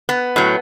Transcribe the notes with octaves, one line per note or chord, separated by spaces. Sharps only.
B3
A2 F#3